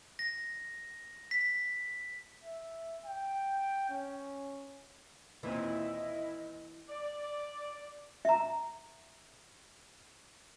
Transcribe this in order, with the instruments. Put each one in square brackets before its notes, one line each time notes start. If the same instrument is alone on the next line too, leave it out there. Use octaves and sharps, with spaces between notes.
[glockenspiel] A#6
B6
[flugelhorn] E5
G5
C#4
[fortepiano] D#2 A#2 C4 [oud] E3 [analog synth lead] E4 [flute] D#5
[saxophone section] D5
[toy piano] E5 A#5